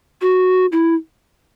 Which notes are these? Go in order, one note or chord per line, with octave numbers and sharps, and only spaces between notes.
F#4
E4